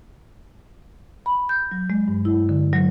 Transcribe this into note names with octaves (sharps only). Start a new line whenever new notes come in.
B5
G6
F#3
G#3
G2
E4
D3
F#3